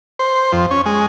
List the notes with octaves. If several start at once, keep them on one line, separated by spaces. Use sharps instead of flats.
C5
F2
C#4
G#3